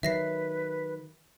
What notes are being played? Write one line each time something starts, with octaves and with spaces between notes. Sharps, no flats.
D#3 F#3 B4 E5 A#6 C7